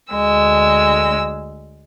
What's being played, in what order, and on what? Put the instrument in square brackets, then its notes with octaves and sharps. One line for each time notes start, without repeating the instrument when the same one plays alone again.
[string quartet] D2 G#3 E6